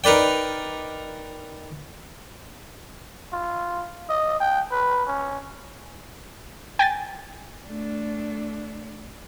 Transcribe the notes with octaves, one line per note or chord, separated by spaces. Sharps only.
D#4 A#4 B4 D5 G5
F4
D#5
G5
B4
C#4
G5 G#5 A6
A3 D4